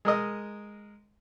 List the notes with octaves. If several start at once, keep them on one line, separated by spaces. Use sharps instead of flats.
G#3 A#4 D#5